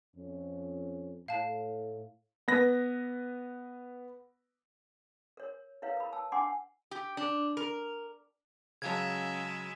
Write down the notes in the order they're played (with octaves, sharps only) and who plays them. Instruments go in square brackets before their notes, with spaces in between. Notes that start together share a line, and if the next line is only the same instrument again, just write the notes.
[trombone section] F2 C#4
[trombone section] A2 [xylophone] F5 A5
[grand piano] B3 B4 A#6
[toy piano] A#4 C#5
E4 A#4 B4 C#5 F5
A#4 B5
A5 E6
D4 F#5 G#5 C6 D6
[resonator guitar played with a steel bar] G4
D4
A#4
[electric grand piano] C#3 F#3 [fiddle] G#3 E5 [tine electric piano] C#4 F5 A5 [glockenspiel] G#6